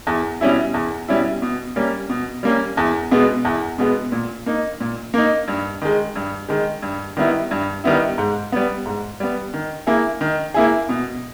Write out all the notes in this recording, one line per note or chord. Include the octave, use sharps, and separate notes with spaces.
E2
B2 G3 C#4 E4
E2
B2 G3 C#4 E4
B2
G3 A#3 C#4
B2
G3 A#3 C#4
E2
B2 G#3 B3
E2
B2 G#3 B3
A#2
A#3 D#4
A#2
A#3 D#4
G2
D#3 G#3
G2
D#3 G#3
G2
D#3 G3 B3 E4
G2
D#3 G3 B3 E4
G#2
G3 B3
G#2
G3 B3
D#3
A#3 E4 G#4
D#3
A#3 E4 G#4
B2